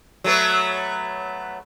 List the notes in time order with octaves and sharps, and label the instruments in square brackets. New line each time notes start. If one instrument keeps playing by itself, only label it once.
[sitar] F#3 A3 B3